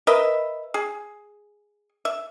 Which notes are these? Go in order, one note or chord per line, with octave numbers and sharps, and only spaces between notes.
A#4 B4 D#5 E5
G#4
E5